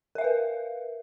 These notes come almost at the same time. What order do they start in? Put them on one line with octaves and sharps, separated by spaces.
A#4 E5 F5 B4